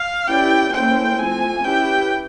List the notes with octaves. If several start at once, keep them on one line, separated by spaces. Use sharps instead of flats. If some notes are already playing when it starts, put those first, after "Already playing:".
Already playing: F5
C#4 E4 G4 B4 D5 G5
A#3 C#4 E4 A4 C5 G5
F3 A3 C4 F4 G#5
C#4 E4 G4 B4 G5